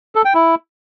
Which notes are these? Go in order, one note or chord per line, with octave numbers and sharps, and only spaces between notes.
A4
G5
E4